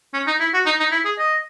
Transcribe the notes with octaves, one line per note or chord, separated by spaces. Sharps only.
C#4
D#4
E4
F#4
D#4
D#4
E4
G#4
D#5